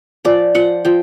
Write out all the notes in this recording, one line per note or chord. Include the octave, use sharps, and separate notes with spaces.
F3 D5
F3 F#5
F3 G5